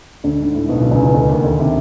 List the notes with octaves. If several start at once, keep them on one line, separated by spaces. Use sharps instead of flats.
D2 D3
G#2
A2
B1 B2
B1 B2
C#2 C#3
C#2 C#3
D2 D3
D#2 D#3
D2 D3
C3